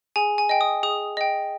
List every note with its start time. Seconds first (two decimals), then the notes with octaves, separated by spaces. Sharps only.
0.16 G#4 G#5
0.38 G#5
0.49 D#5 G5
0.61 D#6
0.83 G#4 D#6
1.17 D#5 G5